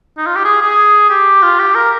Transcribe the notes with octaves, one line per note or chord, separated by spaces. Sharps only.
D#4
F4
G4
G#4
G#4
G4
F4
G4
A#4